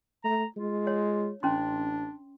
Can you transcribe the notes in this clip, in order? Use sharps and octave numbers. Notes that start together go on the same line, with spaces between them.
A3 A#5
G#3 F4
C#5
A1 C#4 D4 C6